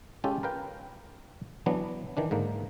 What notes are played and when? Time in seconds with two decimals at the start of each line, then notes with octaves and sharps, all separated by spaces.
0.24 G#3 C#4 F4 G4 A4
0.43 A#4 B4 F5 G5
1.66 E3 F#3 B3 D4
2.17 D#3 E3 D4
2.31 G#2 D3 A#3